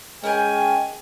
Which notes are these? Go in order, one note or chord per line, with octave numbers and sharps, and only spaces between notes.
G#3 C#4 A#4 G5 G#5